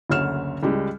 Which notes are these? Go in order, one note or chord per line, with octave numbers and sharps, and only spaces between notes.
F#1 D2 D3 C#5 F6 E7
C#2 G3 G#3